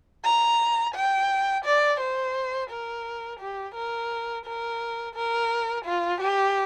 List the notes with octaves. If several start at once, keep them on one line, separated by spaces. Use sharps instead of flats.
A#5
G5
D5
C5
A#4
G4
A#4
A#4
A#4
F4
G4